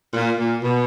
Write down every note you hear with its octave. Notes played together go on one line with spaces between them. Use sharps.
A#2
A#2
B2